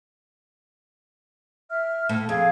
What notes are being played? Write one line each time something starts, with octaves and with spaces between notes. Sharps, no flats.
E5 F6
A2
F2 G#4 F5 G#6